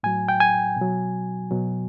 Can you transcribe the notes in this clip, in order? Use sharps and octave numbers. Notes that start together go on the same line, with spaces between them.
A2 F#3 G#5
G5
G#5
B2 F#3
B2 F#3